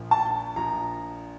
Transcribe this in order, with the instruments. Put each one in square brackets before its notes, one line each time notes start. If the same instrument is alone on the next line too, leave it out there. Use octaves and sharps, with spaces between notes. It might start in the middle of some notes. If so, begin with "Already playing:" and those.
Already playing: [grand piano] A#1 A#2 F3
[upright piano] A5
[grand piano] A#1 A#2 F3 [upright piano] A#5